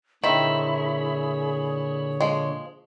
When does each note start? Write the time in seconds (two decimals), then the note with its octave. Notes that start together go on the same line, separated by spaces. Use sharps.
0.24 A#2 D3 D#3 C4 E4 G#4 C#5
2.21 F3 G#3